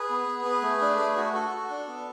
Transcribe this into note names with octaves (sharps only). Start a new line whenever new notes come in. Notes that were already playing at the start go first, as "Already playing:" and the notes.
Already playing: G#4 B4
B3
B3
B3
A3
D4
A3
F#4
F#4 A4
F#4
D4
B3